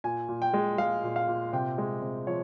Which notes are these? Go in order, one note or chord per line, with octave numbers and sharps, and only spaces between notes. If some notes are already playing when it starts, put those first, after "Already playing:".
A#2 G#5
A#2
G5
G#3
G#3 F5
A#2
F5
A#2
C3 G5
G#3
C3
F3 C#5